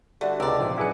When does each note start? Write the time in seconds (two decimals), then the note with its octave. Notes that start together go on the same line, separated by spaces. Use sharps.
0.21 D3 G3 A3 F#4
0.40 C#2 C3 A#4 D5 A5 A#5 E6
0.60 A#2 F3
0.78 F#2 E4 F#4 G#4 B4 C#7